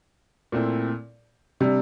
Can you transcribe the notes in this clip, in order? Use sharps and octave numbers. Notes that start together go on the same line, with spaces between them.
A#2 A3 C4 E4
C3 G3 D4